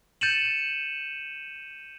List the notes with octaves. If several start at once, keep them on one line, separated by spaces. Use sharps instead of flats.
G6 A6 C#7 D#7 E7 F#7